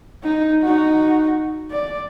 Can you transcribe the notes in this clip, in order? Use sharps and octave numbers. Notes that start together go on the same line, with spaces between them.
D#4
D#4 F#4
D5